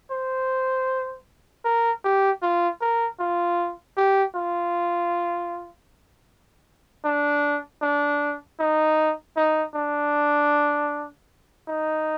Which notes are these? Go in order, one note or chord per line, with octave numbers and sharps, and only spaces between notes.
C5
A#4
G4
F4
A#4
F4
G4
F4
D4
D4
D#4
D#4
D4
D#4